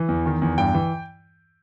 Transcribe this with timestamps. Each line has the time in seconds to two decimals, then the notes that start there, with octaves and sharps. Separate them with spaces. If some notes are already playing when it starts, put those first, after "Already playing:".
Already playing: E3
0.09 E2
0.26 D#3
0.42 E2
0.58 G2 G5
0.74 E3